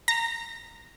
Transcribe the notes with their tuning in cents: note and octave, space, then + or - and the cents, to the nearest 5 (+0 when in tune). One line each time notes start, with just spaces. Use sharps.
A#5 -15